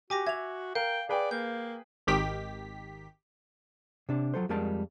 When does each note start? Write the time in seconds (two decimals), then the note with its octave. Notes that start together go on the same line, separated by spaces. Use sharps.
0.10 F#4 G4 G#5 D6 A#6
0.27 E5 G#6 F7
0.75 A#4 F5 G5
1.09 G#4 B4 D5 G5
1.31 A#3 G6
2.07 G#1 D#3 G4 B6
4.09 C3 D4
4.34 F3 F#3 A4 C5
4.49 F2 G3 G#3 A#4 F5 A5